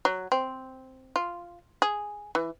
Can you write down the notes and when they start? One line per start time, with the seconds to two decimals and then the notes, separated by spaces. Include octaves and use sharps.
0.05 F#3
0.32 C4
1.16 F4
1.82 G#4
2.35 E3